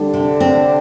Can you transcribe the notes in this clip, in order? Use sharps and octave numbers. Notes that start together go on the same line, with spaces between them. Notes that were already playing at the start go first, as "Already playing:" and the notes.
Already playing: D3 G3 D4
C3
C4